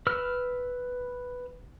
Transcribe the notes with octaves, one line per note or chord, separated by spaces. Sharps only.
B4 E6 F6